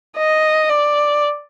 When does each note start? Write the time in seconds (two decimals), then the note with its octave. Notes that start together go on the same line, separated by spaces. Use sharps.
0.17 D#5
0.69 D5